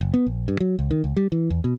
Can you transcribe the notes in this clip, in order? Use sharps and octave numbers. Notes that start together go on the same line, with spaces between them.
F#1
B3
A#1
G2
F#3
C#2
D#3
C#2
G3
E3
E2
B2